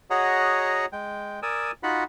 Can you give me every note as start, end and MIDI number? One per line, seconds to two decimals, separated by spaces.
0.10 0.86 66
0.10 0.86 68
0.10 0.86 73
0.10 0.86 75
0.10 0.86 78
0.10 0.86 82
0.92 1.40 56
0.92 1.40 79
1.42 1.71 70
1.42 1.71 74
1.42 1.71 80
1.42 1.71 87
1.42 1.71 88
1.83 2.04 63
1.83 2.04 65
1.83 2.04 66
1.83 2.04 78
1.83 2.04 83